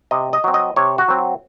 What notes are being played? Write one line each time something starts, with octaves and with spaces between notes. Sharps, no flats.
C3 D#5
D#5
F#3 C4
D#5
C3 C#5
F#4
F#3 C4